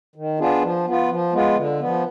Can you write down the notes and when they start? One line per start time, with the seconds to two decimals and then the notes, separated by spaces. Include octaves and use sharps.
0.16 D#3
0.39 B3 D4 F4 G#4
0.62 F3
0.87 B3 F4
1.10 F3
1.33 G#3 B3 F4
1.57 D3
1.80 F3 B3